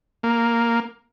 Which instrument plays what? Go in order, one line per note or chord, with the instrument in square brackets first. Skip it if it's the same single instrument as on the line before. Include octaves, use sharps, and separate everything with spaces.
[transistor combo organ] A#3